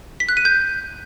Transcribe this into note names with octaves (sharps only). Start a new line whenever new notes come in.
B6
F#6
D#7
G6